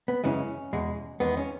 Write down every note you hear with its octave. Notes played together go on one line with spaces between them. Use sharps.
B3
F#2 C#3 E3 G#3 C#4
E2 B2 G#3
E2 D#3 G#3 B3
C#4